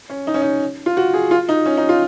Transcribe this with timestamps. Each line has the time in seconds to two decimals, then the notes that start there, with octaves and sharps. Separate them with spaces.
0.10 C#4
0.27 D#4
0.34 C#4
0.42 D#4
0.86 F4
0.97 F#4
1.14 G#4
1.31 F4
1.49 D#4
1.66 C#4
1.77 D#4
1.89 F4